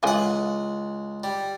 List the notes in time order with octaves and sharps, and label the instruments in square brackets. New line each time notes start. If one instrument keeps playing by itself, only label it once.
[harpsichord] C#2 F#5 [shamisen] E3 F4 G#4
[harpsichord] G3